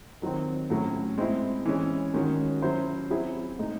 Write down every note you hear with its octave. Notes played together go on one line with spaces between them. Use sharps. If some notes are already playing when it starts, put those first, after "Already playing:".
D#3 F#3 C4
A2 F#3 C#4
G#3 C4 E4
E3 G#3 C#4 G#4
D#3 G#3 C#4 F#4
F#3 C#4 E4 C5
F#3 C4 E4 G#4
A2 G#3 D#4